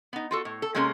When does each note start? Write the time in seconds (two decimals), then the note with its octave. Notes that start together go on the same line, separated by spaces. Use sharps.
0.13 B3 D#4
0.31 F4 F#4 A4
0.45 A2
0.62 A4
0.75 C3 G#3 A#3 C#4 G#4 A#4